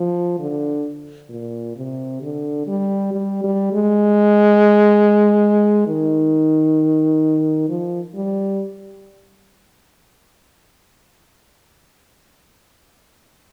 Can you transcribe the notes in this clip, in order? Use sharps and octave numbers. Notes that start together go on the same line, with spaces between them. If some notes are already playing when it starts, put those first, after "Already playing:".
Already playing: F3
D3
A#2
C3
D3
G3
G3
G3
G#3
D#3
F3
G3